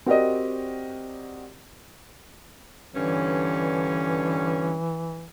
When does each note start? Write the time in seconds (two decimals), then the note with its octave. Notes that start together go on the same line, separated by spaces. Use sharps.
0.06 C4 F#4 G4 A#4 D5 D#5
2.95 G2 D3 E3 C#4